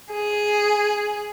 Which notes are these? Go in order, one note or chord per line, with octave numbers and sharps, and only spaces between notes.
G#4